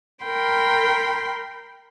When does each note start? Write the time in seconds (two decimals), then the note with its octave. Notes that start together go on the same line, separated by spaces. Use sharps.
0.25 A#4 G5 B5 C6